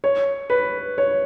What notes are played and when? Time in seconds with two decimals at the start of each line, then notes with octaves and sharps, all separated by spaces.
0.04 C#5
0.50 B4
0.98 C#5